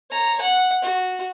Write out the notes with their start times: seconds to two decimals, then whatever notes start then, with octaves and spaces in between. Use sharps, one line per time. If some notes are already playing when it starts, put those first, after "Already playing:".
0.10 C#5 A#5
0.42 F#5
0.82 F#4